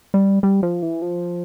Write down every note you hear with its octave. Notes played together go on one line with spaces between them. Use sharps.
G3
G3
F3
E3
F3